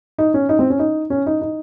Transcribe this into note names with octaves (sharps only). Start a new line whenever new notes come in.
D#4
C#4
D#4
C4
C#4
D#4
C#4
D#4
D#4